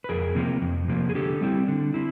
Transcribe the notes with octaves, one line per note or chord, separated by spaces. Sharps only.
B4
F2 G#4 A#4
C3 F3 A#3
F2
C3 F3 A#3
G#4
D3 G4 A4
G3 C4 E4
D3
C4 E4